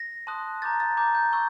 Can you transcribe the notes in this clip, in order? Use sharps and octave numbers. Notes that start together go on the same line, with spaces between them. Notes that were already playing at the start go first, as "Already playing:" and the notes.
Already playing: A#6
A5 C6 D#6 F#6
A#5 D6 G6 A6
A6
A#5 D6 G6
G6
C#6 E6 G6